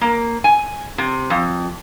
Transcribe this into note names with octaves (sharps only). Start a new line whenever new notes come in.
A#3
G#5
C3
F2